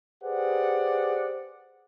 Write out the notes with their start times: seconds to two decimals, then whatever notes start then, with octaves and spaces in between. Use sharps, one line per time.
0.23 G4 G#4 B4 C5 D5 F#5